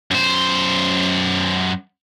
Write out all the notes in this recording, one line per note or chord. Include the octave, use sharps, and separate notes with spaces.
F#2 C5